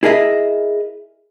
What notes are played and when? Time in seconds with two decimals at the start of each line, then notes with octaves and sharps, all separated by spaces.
0.03 E4 G#4 A#4 D#5 E5